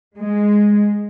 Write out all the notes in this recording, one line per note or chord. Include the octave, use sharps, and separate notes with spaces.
G#3